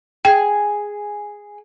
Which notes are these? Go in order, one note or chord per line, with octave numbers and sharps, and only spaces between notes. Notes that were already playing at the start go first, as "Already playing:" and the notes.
G#4 G5